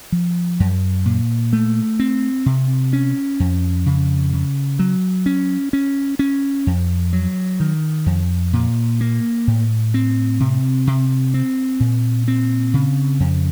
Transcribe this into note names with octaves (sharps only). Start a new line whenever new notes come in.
F3
F#2
A#2
A3
C4
C3
C#4
F2
C#3
C#3
F#3
C#4
C#4
C#4
F2
F#3
D#3
F2
A#2
A#3
A2
C4
C3
C3
C4
A#2
C4
C#3
F2